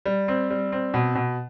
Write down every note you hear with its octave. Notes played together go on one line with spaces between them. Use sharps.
G3
C4
G3
C4
B2
B2